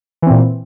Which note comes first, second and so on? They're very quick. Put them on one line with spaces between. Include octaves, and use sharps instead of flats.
E3 C4 A#2